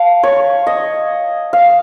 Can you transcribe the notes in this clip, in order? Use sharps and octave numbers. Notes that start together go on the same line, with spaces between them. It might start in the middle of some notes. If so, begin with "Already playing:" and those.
Already playing: F5 A5
C#5
D#5
F5